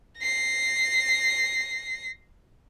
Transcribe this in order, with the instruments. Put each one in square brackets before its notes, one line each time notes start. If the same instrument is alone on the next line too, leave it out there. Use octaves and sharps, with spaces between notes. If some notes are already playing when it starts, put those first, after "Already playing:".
[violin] A#6 C7